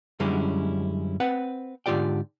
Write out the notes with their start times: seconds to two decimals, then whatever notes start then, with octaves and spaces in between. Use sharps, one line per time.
0.20 F#2 D3 G3 G#3 C#4 E4
1.20 C4 B4 F#5
1.86 G#2 D3 F4 G4 D5 G5